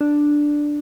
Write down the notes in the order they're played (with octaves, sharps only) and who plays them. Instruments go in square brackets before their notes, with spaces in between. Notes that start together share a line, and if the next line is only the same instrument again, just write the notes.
[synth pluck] D4